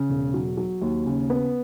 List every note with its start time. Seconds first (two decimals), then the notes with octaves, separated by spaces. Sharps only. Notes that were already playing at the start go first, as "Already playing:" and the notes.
Already playing: C#3
0.10 E1
0.34 F#3
0.57 F#3
0.81 D#2
1.06 C#3
1.30 B3